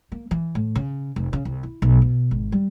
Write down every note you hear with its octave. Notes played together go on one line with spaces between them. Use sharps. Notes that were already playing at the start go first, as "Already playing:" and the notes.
A#3
E3
A2
C#3
F1
C#3
C2
E4
B1
B2
G#1
G3